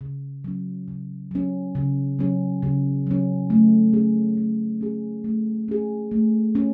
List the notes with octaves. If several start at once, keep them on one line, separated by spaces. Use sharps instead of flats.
C#3
F#3 C#4
C#3
F#3 C#4
C#3
F#3 C#4
C#3
F#3 C#4
A3
C#4 G#4
A3
C#4 G#4
A3
C#4 G#4
A3
C#4